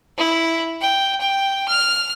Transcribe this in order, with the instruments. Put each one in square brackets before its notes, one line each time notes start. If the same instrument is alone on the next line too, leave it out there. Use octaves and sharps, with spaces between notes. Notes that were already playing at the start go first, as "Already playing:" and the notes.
[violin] E4
G5
G5
F6